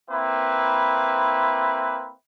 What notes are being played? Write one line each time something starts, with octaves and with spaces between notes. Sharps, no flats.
A#3 C4 E4 B4